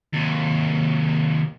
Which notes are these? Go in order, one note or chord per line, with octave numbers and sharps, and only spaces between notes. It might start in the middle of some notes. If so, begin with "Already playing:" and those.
D#2 C3